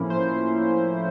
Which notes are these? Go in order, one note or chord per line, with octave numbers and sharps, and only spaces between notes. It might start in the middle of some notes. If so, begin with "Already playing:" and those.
Already playing: A2 F3 A#3 C#4 E4
C5